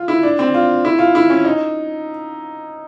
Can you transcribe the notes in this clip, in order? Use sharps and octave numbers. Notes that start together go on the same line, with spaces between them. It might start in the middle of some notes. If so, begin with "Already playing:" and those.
Already playing: F4
E4
D4
C4
F4
E4
F4
E4
C#4
D#4